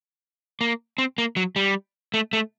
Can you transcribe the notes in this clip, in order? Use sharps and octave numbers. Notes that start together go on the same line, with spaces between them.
A#3
C4
A#3
F#3
G3
A3
A3